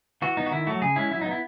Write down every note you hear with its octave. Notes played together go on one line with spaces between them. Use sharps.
E3 F#4
B3 D#4
F#4
D#3 E4
F#3 A3 F#4
C#3 G#4
G#3 C#4 E4
F#3 E4
D#4
B3
E4